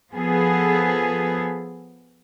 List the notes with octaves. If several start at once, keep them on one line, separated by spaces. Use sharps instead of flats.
F3 B3 G#4 A4